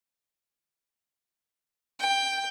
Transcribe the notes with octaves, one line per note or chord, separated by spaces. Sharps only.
G5